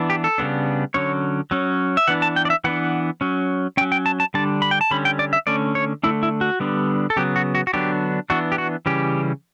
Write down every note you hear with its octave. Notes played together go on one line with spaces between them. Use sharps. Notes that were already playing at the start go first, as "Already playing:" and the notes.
Already playing: E3 B3 D4
G4
A4
C#3 G3 B3 D4
D3 F#3 C#4 C#5
F#3 C#4
E5
E3 B3 D4 F#5
A5
G5
D5
E5
E3 B3 D4 F#5
F#3 C#4
F#3 C#4 G5
G5
A5
A5
D3 G3 D4 A5
B5
G5
A5
D3 G3 C#4 B5
G5
D5
E5
D3 A3 C#4 D5
C#5
D3 A3 D4 E4
E4
F#4
D3 G3 B3 D4
A4
C#3 F#3 B3 G4
F#4
F#4
F#4
D3 F#3 B3 D4 G4
E3 B3 D4 F#4
G4
F#4
C#3 E3 G3 C#4 G4